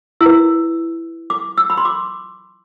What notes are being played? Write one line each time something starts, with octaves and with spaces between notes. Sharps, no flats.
E4 E6
B4
D6
E6
B5
C6
D6